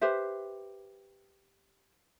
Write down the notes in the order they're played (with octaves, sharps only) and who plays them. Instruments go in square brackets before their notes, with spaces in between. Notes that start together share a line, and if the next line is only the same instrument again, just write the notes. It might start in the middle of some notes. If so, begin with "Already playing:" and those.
[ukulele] G4 B4 C5 E5